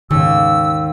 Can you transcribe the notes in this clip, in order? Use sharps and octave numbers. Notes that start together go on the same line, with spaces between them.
D#2 G#2 C#3 E6